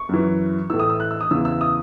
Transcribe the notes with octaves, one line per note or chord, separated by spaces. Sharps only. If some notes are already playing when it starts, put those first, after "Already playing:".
Already playing: C#6
F#2 E3
A2 E3 E6
D#6
E6
F#6
E6
D#6
E2 C#3 E3 E6
E6
D#6